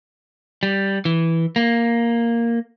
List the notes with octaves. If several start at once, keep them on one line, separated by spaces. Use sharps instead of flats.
G3
E3
A#3